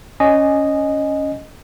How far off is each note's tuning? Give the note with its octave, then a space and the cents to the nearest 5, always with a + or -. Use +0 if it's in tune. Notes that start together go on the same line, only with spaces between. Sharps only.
C#4 +5 D#5 -10 G#5 +0